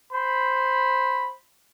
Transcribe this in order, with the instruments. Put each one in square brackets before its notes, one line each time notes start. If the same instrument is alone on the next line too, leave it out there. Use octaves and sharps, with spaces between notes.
[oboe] C5 [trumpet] B5